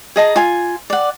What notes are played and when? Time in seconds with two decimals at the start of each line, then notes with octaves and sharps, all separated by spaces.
0.16 G#4 D#5 A5 A#5
0.36 F4 G#5
0.90 D5 F#5